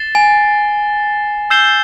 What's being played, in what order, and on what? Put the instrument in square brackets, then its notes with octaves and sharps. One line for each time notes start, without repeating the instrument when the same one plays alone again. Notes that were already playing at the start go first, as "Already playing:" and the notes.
Already playing: [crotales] A6 C7 E7 G7
[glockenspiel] G#5
[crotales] E6 G6 C7 E7 G7